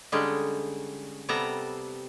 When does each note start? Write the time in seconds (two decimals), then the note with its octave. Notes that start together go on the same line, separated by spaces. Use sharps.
0.12 D3 G3 G#3 C#4 D#4
1.29 C3 G3 B3 A4 A#5